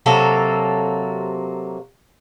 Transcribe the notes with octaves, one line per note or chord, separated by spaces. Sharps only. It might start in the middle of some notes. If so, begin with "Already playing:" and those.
C3 F#3 A#3 A4